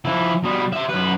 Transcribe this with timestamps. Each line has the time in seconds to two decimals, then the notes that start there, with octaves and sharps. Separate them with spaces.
0.05 F3 E4
0.44 B2 G3
0.73 G4 E5
0.89 F#2 B4